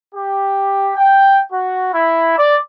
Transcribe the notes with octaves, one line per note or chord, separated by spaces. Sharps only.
G4
G5
F#4
E4
D5